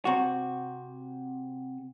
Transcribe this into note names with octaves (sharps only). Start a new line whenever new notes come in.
C3 F#4